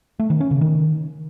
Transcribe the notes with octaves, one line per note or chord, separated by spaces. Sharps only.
A3
D#3
C#4
C#3
D#3